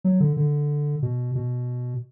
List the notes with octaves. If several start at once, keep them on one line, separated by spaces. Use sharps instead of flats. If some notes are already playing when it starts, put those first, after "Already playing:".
F#3
D3
D3
B2
B2